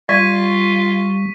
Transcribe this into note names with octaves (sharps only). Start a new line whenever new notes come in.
G3 F4 D5 C#6 B6 D#7